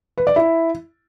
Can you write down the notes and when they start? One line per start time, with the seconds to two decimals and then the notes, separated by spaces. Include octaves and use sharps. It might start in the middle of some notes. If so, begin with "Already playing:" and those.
0.17 B4
0.27 D5
0.36 E4